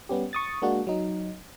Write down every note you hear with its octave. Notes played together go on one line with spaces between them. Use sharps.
G3 B3 C#4 G4
C#6 D#6 A6
G#3 A#3 D4 F#4
F#3 D#4